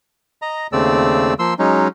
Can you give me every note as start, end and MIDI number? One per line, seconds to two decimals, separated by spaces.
0.42 0.67 75
0.42 0.67 82
0.72 1.34 39
0.72 1.34 49
0.72 1.34 57
0.72 1.34 60
0.72 1.34 74
0.72 1.34 88
1.39 1.54 53
1.39 1.54 58
1.39 1.54 84
1.39 1.54 88
1.59 1.88 54
1.59 1.88 56
1.59 1.88 61
1.59 1.88 63